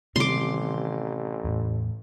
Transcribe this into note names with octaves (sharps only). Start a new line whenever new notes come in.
A1 C3 D#3 G3 C6 D6
E2 A2